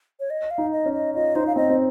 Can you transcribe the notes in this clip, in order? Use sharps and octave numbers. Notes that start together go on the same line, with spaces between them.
C#5
D#5
F5
D#4
D#5
C#4
D#5
F4 D#5
D#4 C5
F5
C4 D#5
C4